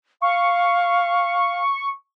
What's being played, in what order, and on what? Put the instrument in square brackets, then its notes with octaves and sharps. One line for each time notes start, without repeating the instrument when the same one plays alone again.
[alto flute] F5 [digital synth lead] C#6